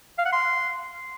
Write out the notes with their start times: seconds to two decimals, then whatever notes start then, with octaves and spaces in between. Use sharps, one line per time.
0.18 F5
0.25 F#5
0.33 C6